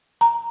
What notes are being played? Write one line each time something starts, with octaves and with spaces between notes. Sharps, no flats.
A#5